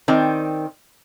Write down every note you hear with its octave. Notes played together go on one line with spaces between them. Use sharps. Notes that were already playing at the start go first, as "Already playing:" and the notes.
D#3 C4 D5